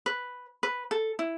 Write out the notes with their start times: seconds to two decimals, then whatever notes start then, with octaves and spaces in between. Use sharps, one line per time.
0.06 B4
0.63 B4
0.91 A4
1.19 E4